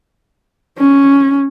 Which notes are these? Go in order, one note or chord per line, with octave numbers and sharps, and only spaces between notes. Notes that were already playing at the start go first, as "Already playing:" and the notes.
C#4